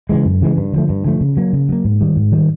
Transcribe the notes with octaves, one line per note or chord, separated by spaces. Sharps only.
C#3 E3 G#3
F#2
C#3 E3 G#3
G2
D3 F3 A3
G2
D3 F3 A3
C#3
F#3 A#3
C#3
F#3 A#3
G#2
D#3 G3
G#2
D#3 G3